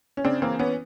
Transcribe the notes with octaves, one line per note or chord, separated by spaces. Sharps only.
C#4
C#3 C4 D4
E3 A#3 C4
E3 B3 C#4